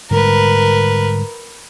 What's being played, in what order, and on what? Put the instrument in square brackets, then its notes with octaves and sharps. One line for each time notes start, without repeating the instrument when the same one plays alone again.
[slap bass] G#2 D3 G3 [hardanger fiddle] A#4 B4